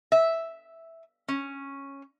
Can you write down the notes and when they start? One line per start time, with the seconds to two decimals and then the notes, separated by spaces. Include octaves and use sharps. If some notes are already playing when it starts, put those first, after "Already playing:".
0.12 E5
1.28 C#4